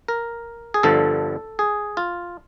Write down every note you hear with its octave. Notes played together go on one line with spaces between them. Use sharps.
A#4
G#4
G1 G2 D3 F3 A4
G#4
F4